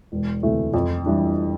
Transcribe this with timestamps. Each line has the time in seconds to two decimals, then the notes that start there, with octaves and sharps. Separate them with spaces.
0.12 E1
0.43 D2 C3 E3 A3
0.74 F2
1.06 E3 G3 D4